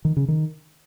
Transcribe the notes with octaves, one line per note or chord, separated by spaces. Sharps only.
D#3
C#3
D#3